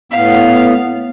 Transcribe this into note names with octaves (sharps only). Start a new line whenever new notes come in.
A2 B3 F5